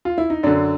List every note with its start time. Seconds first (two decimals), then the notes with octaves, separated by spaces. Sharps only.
0.05 F4
0.18 E4
0.30 D#4
0.43 F#2 D3 D4